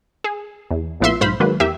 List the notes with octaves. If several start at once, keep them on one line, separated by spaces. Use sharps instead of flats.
G#4
E2
A#1 A2 B3 F4 E5 C6
B1 G#2 C5 F5 B5
D#3 F#3 G#3 A#3 B4
E2 G4 A#4 E5